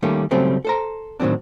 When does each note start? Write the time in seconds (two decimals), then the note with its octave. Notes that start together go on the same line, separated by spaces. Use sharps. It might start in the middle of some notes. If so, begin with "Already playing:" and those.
0.02 D#3 G3 A3 A#3 C#4
0.31 C#3 F#3 G3 A3 C4 C#4
0.65 A4 C5 A#5
1.20 A2 D#3 F#3 C4 D4